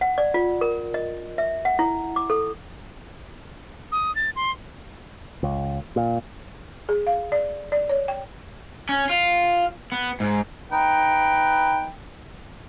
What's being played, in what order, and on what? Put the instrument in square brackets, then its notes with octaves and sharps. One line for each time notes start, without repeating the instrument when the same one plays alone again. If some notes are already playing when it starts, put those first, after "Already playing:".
[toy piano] F#5
D5
F4
A#4
D#5
E5
F#5
E4
D6
A4
[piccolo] D#6
A6
C6
[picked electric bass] C#2
A#2
[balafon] G#4
F5
D5
D5
C#5
G5
[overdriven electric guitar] C#4
F4
B3
G#2
[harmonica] D#4 B4 G5